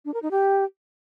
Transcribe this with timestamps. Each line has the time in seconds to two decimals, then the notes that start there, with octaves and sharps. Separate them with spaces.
0.05 D4
0.14 A#4
0.22 D#4
0.31 G4